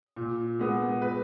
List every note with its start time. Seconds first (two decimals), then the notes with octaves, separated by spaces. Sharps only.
0.16 A#2
0.59 G#3 B3
1.02 B4